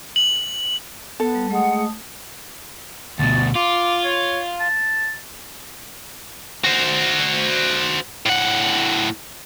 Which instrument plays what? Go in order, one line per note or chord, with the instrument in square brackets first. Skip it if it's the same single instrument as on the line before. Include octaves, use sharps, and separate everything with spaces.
[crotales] F#7
[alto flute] B3 [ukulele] A4
[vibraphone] G3
[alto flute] G#3 [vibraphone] A3 D#6 [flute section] F#5
[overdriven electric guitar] D2 B2 [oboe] A5
[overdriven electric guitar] F4 [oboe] D6
[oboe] C#5
A5
[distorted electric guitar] F#4 C5
A2 F#5